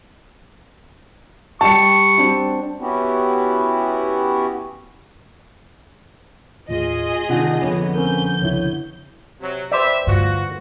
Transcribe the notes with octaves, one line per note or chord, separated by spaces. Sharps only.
G3 G4 A5 C#6 C#7
C4 D4 F#4
B3 C#4 E4 F#4 G4
D#2 A2 F4 G#4 D#5
C3 D#3 D4 F4 F#5
F2 D3 B3 C#5
C4 C#4 A#4 G6
C2 C#3 E4 C#5
C3 F#3
G4 B4 C5 D5 E5
D2 G2 E3 F4 F#4